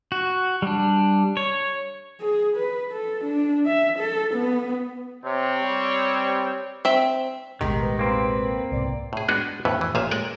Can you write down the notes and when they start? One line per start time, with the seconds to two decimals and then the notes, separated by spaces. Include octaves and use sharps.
0.12 F#4
0.62 G3 D4
1.37 C#5
2.21 G#4
2.56 B4
2.92 A4
3.24 D4
3.66 E5
3.99 A4
4.34 B3
5.24 C3 C4 C#5
5.63 G3
6.85 C4 E5
7.61 A1 D#2 B2 D#3 G#3 G4
7.81 B4
7.99 A#3 C4 B4
8.72 C2 G#2 B2 D5
9.13 A2 G#4
9.28 G#3 B3 D4 D#4 F#4 G#4
9.65 F2 A2 E3 B3 B4
9.81 E3
9.95 A1 A#2 F3 E5 F5 G#5
10.11 G#3 A#4 D5 G5 G#5